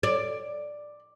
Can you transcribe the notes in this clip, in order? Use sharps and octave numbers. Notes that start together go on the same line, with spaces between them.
D5